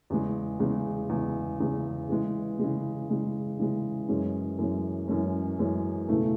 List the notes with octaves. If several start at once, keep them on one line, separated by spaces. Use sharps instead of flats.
E2 C#3 G#3
E2 C#3 G#3
E2 C#3 G#3
E2 C#3 G#3
C#3 E3 G#3
C#3 E3 G#3
C#3 E3 G#3
C#3 E3 G#3
F#2 E3 G#3 C#4
F#2 E3 G#3 C#4
F#2 E3 G#3 C#4
F#2 E3 G#3 C#4
E1 E2 C#3 E3 A3